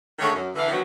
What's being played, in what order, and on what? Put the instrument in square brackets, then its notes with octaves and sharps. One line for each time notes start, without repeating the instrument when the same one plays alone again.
[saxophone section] D3 D#3 G#3 A3 C#5
F#2
D3 E3 F5
D3 D#3 F3 F#3 B3 C#4